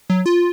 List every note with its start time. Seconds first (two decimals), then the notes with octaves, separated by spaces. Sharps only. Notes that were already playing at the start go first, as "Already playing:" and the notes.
0.10 F#3
0.26 F4